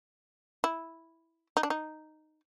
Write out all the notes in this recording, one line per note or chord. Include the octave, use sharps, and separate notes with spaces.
E4
D#4
D4
D#4